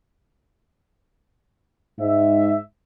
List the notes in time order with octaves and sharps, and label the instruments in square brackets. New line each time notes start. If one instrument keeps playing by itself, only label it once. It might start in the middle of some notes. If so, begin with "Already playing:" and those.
[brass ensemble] G#2 E5